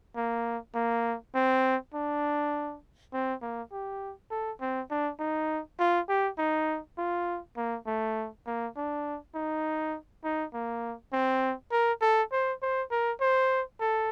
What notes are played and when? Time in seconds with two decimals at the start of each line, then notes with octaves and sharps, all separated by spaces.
0.16 A#3
0.75 A#3
1.35 C4
1.94 D4
3.13 C4
3.42 A#3
3.72 G4
4.31 A4
4.61 C4
4.91 D4
5.20 D#4
5.79 F4
6.09 G4
6.38 D#4
6.98 F4
7.57 A#3
7.87 A3
8.47 A#3
8.77 D4
9.35 D#4
10.24 D#4
10.54 A#3
11.13 C4
11.72 A#4
12.02 A4
12.32 C5
12.62 C5
12.91 A#4
13.21 C5
13.80 A4